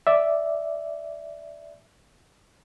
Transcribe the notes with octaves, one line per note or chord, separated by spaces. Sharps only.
D5 E5